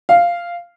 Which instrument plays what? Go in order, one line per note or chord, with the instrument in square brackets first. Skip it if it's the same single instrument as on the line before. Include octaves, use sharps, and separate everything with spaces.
[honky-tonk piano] F5